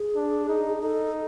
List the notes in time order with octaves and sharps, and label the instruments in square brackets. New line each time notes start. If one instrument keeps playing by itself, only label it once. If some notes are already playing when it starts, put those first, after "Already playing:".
Already playing: [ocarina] G#4
[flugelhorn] D4
D#4
[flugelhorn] D#4 [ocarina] A4